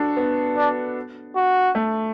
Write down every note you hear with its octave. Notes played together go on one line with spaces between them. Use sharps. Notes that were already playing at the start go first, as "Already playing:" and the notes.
Already playing: D4 F#4 A4
B3
D4
F#4
A3